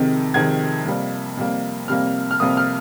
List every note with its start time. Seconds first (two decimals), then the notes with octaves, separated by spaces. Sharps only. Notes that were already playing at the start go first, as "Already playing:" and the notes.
Already playing: F2 C3 D#3 G#3
0.34 F2 C3 D#3 G#3 G#6
0.85 F2 C3 G3 A#3
1.37 F2 C3 G3 A#3
1.88 F2 C3 G3 A#3 F6
2.31 F6
2.40 F2 C3 G3 A#3 D#6
2.57 F6